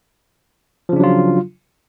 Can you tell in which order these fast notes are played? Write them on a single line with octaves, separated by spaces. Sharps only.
F3 C#3 D4 F#3 F4